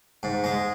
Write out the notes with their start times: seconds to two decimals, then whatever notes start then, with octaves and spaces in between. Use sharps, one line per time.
0.23 G#2
0.44 G#3